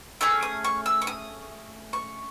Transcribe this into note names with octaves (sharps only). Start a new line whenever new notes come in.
A3 C#4 G#4 E6
D#6
C#6
E6
C#6
D#6
C#6